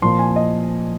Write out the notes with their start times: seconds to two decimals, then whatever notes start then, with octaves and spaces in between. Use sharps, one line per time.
0.02 A#2 F3 A#3 C6
0.19 G#5
0.36 D#5